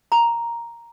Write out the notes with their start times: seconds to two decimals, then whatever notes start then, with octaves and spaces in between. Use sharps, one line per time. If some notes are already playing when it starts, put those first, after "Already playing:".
0.12 A#5